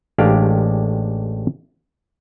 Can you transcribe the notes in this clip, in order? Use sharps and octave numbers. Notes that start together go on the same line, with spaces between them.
A1 G#3 D4 G4 D5 F5